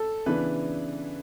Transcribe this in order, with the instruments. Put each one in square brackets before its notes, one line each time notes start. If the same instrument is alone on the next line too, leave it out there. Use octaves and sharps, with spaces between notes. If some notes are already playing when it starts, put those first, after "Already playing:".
Already playing: [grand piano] A4
C#3 E3 B3 D4 B4